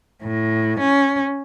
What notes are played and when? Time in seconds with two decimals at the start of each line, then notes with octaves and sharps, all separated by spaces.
0.22 A2
0.80 C#4